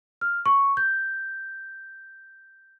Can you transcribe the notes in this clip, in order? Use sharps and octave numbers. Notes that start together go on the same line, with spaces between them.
F6
C#6
G6